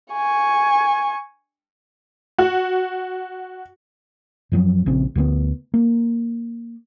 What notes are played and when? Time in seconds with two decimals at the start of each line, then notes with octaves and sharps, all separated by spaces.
0.13 G#5 C#6
2.38 F#4
4.52 F#2 F3 F#3
4.86 A#1 C#3 C4
5.15 D2 D3 D#3 B3
5.74 A#3